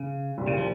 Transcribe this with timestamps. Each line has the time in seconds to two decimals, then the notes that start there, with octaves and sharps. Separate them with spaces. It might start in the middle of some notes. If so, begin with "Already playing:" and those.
Already playing: C#3
0.38 C2 A#2 G3
0.48 C#3
0.58 F3